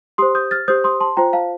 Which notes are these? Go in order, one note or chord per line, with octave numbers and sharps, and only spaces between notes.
G4 C5 C6 D#6
D#6 G6
F6 A6
G4 C5 D#6 G6
C6 D#6
A5 C6
F4 C5 G5 A#5
F5 A5